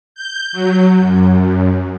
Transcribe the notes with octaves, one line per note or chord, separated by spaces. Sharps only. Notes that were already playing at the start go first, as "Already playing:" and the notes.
G6
F#3
F#2